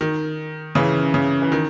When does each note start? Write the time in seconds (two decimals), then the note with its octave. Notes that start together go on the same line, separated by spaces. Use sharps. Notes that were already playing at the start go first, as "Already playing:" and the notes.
0.01 D#3
0.75 C#3 E3
1.14 C#3
1.42 E3
1.52 D#3